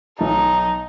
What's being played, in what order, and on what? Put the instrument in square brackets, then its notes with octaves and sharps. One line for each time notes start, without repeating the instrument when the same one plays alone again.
[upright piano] B1 A5 [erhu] D#4